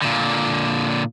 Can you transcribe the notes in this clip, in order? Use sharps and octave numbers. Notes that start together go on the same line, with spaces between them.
A#2 D3